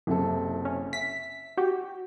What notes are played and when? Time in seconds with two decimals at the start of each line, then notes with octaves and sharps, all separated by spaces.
0.07 F#1 C3 A4
0.65 C#4
0.93 E5 B6
1.57 F#4 G4